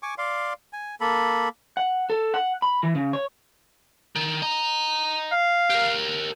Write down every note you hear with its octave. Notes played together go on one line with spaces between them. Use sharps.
G#5 C#6 D6
D5 F5 C6
G#5
A#3 A4 B5
F#5
A4
F#5
B5
E3
C#3
C#5
D#3
D#5 A#5
F5
G4 A#4